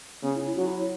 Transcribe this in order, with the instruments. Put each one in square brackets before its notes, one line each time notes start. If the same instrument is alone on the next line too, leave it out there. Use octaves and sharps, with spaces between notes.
[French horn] C#3 [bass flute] B3
[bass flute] E4
E4
[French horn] F#3 [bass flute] F#4
[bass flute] E4